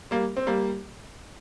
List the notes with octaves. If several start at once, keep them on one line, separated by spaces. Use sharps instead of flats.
G3 A#3
C4
G3 A#3